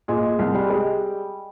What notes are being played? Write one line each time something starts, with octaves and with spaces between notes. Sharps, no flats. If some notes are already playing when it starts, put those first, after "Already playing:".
A#2 G#3
C2
G3
G#3